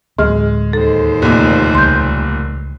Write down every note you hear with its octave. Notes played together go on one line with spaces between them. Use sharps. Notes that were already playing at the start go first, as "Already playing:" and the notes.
D2 A2 F#3 G#3 F6
D#2 A4 C5
F1 A#2 D3
C#2 G3 C6 G6